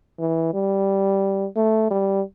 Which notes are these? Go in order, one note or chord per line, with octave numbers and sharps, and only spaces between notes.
E3
G3
A3
G3